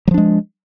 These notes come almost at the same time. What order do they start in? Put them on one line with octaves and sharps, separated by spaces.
F#3 F3 D4 G#3